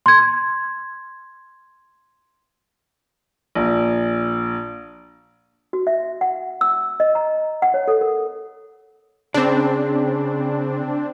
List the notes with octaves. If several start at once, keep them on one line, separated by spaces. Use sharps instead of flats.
C6 G#6
A#1
F#4
E5
F#5
E6
D#5
A#5
F#5
C#5
A4
A#4
C#3 C4 D4